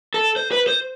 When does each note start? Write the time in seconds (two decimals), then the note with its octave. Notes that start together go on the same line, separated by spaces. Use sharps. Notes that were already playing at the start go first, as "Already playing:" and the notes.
0.14 A4
0.36 C5
0.52 B4
0.67 C5